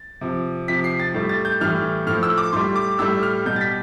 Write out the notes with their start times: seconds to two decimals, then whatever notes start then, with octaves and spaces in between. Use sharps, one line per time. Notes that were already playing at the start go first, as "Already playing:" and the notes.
Already playing: A6
0.21 C3 F3
0.68 C3 F3 B6
0.84 C7
1.00 A6
1.14 A2 G3
1.29 A6
1.45 G6
1.61 A2 E3 G3 F6
2.07 A2 F3 F6
2.23 E6
2.38 D6
2.53 A2 G3 C6
2.76 D6
2.99 A2 G3 E6
3.23 F6
3.46 B2 G3 G6
3.56 A6
3.61 B6